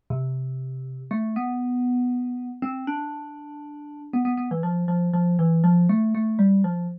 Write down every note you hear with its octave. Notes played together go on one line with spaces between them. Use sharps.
C3
A3
B3
C4
D4
B3
B3
B3
E3
F3
F3
F3
E3
F3
A3
A3
G3
F3